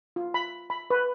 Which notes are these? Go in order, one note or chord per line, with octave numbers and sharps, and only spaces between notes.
F4
B5
B5
B4